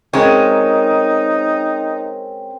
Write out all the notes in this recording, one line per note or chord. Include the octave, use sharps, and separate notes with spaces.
G#3 C4 C#4 D#4 A#4